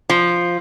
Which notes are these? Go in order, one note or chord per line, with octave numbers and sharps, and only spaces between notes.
F3